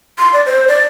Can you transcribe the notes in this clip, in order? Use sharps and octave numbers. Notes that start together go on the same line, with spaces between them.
C6
D5
C5
D5